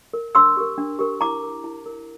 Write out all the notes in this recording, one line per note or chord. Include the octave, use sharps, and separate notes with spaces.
A#4
D4 C6 E6
G4 A#4
D4
G4 A#4
E4 A#5 D6
A#4
E4
A#4